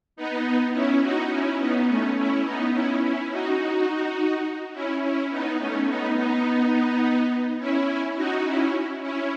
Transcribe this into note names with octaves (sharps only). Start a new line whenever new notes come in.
B3 D#4
C#4 E4
D#4 F#4
C#4 E4
B3 D#4
A3 C#4
C#4 E4
B3 D#4
C#4 E4
C#4 E4
D#4 F#4
C#4 E4
C#4 E4
B3 D#4
A3 C#4
B3 D#4
B3 D#4
C#4 E4
D#4 F#4
C#4 E4
C#4 E4